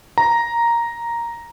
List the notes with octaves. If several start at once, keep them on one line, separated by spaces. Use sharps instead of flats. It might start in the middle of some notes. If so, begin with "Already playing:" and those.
A#5